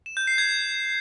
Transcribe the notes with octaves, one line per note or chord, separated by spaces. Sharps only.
E7
G6
C7
G#6